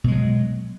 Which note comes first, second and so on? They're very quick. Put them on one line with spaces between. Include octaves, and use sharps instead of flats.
B2 G#3 F#3